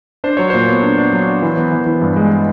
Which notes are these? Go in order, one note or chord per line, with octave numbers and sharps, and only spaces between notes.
D4 C5
F#3 C#5
A#2 C5
B3
D4
D4
F#3
D4
E3
B3
E3
E3
G2
G#3
G#3